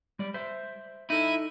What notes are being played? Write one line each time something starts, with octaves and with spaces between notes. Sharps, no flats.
G3 D5
C5 E5
D#4 E4 A4 D#7